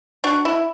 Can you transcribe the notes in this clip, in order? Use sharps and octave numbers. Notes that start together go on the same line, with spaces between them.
D4 F#4
E4